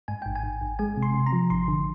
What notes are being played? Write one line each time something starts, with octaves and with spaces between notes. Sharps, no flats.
G#2 G#5
G#1 G5
G#5
G#1
G#1
G#3 G#5
C3
C6
C3
A#5
F3
G#1 C6
D3